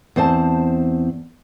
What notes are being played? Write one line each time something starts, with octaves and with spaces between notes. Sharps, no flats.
E2 C4 C5 A5